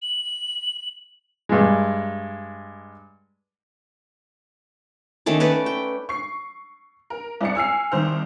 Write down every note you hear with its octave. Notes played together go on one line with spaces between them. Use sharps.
F#7
G2 G#3
D#3 A3 C#4 D5
C#4 B4 D5 A5
G5
C#6 C7
A#4
C2 D5 C#7
G#5 E6 F6 C7
C2 D#3 C5 F6